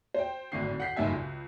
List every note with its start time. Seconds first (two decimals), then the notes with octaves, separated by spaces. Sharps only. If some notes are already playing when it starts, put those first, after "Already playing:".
0.14 C5 G5
0.52 G#1 A2 D3 F#4 C7
0.80 F#5 G6 B6 C7
0.96 F#1 G2 A#3 D#4 E5 G#5
1.13 C#2